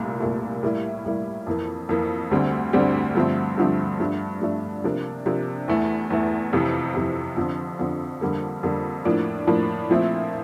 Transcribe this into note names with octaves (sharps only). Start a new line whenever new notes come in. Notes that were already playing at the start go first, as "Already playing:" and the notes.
Already playing: C2 A#2 A3
C2 A#2 A3
A2 G3 A#3 E4
A2 G3 A#3 E4
F2 E3 A#3
F2 E3 A#3
D2 D3 G3 C4
D2 D3 G3 C4
G2 D3 F3 A3 C4
G2 D3 F3 A3 C4
G2 F3 A3 D4
G2 F3 A3 D4
C3 F3 A#3 D4
C3 F3 A#3 D4
E2 E3 A3
E2 E3 A3
F2 C3 E3
F2 C3 E3
F2 D3 F3 C4
F2 D3 F3 C4
F2 D3 G3 A#3
F2 D3 G3 A#3
A2 F3 A#3 D4
A2 F3 A#3 D4
A#2 F3 A3 C4 E4